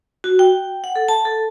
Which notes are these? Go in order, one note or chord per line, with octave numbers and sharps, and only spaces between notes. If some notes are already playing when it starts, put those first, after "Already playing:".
F#4
G5
F#5
A4
A5
A4